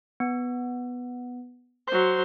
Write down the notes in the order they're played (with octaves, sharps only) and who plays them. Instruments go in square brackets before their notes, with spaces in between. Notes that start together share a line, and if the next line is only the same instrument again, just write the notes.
[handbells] B3
[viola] F#3 C5 [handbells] C6